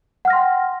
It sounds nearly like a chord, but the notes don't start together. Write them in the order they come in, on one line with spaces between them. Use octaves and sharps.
F#5 F6 A#6 C6 G5